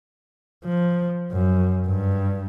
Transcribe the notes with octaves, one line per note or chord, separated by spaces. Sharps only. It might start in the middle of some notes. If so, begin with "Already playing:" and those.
F3
F#2
G2